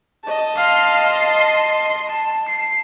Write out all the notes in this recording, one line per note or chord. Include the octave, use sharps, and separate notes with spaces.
D#5 A5
F5 C6
C6
A5
C7